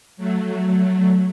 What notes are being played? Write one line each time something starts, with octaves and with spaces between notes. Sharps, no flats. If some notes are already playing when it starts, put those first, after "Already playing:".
F#3 A3